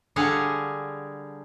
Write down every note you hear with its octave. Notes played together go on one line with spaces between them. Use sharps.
D3 G3 G#4 F5 F#5